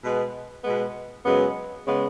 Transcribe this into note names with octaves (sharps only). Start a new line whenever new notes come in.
B2 G#3 B3
B2 G#3 B3
F#2 C#3 G#3 B3
C#3 G#3 B3